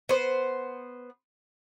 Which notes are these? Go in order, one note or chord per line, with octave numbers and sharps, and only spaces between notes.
B3 C5